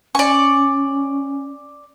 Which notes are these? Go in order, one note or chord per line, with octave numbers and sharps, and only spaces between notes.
C#4 D5 G#5 C#6